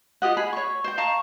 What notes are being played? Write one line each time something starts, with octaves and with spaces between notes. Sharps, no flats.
F4 G4 D#5 F#5
G#4 B5
C#5 C#6
C5 G5
F5 A5 A#5 C#6